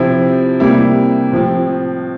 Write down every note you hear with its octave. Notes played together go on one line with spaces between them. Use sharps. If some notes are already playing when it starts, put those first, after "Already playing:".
Already playing: C3 F3 C4 E4
C3 G3 A#3 E4
A2 F3 C4